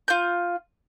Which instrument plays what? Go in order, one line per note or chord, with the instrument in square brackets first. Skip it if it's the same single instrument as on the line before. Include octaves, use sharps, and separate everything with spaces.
[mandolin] F4 G6